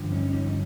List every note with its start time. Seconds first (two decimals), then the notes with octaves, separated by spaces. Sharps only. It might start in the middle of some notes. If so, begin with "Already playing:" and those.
Already playing: G2 D3 F3
0.12 C#4 D#4
0.33 C#4 D#4